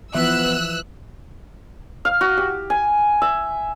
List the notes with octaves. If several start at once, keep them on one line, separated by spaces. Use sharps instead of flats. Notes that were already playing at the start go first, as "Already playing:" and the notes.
E3 F3 B3 E5 E6 F#6
F5
F#4
G4
G#5
E5